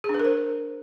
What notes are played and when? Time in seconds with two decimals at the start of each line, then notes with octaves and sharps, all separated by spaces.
0.04 G#4
0.09 D4
0.14 B4
0.20 A#4
0.25 C5